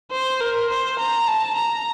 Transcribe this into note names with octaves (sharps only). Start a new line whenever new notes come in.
C5
A#4
C5
A#5
A5
A#5